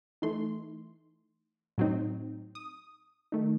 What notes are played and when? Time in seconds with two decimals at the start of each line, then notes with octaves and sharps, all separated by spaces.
0.22 E3 A3 D#4 C6
1.78 A2 F#3 C4 D#4
2.55 D#6
3.32 D#3 A3 D#4